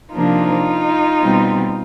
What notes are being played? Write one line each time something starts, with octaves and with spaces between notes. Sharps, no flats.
C3 F3 A#3 D4 D#4 F4
B2 G3 C4